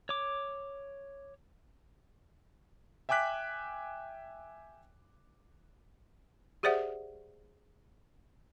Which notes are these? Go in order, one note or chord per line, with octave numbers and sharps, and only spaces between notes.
C#5 D6
E5 G5 G#5 D6 F#6 B6
G4 G#4 C5 D5 E5 F#5